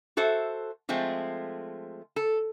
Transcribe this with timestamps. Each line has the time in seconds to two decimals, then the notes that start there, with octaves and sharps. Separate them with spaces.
0.17 F#4 A4 C5 E5
0.89 F3 G#3 A3 C4
2.16 A4